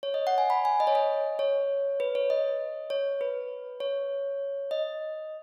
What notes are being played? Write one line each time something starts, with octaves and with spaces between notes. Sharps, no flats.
C#5
D#5
F#5
G#5
B5
G#5
D#5
C#5
D#5
C#5
B4
C#5
D#5
C#5
B4
C#5
D#5